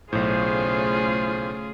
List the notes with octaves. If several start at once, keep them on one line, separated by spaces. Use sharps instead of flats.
B1 A2 C#3 A3 F4 G#4 C5